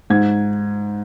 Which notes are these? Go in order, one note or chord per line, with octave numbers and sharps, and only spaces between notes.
G#2 G#6